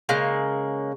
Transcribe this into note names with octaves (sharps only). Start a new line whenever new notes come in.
C#3 G#3 A#3